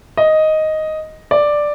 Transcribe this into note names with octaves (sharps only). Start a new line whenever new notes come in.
D#5
D5